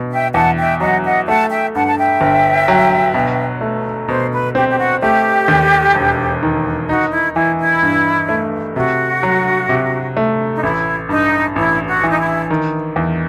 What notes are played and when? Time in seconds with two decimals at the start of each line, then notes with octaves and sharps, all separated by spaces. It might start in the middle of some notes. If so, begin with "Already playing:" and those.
Already playing: B2
0.10 E5 G5
0.34 E2 F#5 A5
0.58 E5 G5
0.80 F#3 D#5 F#5
1.04 D#5 F#5
1.27 A3 F#5 A5
1.51 E5 G5
1.74 G2 F#5 A5
1.87 A5
1.97 E5 G5
2.21 G1
2.68 F#3
3.14 B2
3.61 A3
4.08 B2 C5
4.32 B4
4.55 C4 G4
4.68 G4
4.78 F#4
5.02 A3 G4
5.48 D#2
5.95 E1
6.43 D#3
6.88 D#4 F#4
7.12 E4
7.35 E3 E4
7.59 E4
7.83 G2
8.29 A3
8.75 C3 F#4
9.23 F#3
9.69 C3
10.17 A3
10.55 D#4
10.63 A1 E4
11.09 G2 D#4
11.56 A1 E4
11.87 F#4
12.03 E3 D#4
12.19 E4
12.50 D#3
12.96 E2